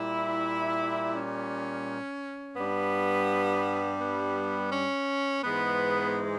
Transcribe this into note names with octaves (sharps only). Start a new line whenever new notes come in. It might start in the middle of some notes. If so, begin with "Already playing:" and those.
Already playing: A#2 G3 E4
C#4
G2 G3 B3
B3
C#4
G#2 E3 G#3 B3